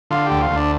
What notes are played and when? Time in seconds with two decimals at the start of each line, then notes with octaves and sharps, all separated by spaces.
0.11 D3 F4
0.26 D2 G4
0.41 F4
0.51 D2
0.56 D4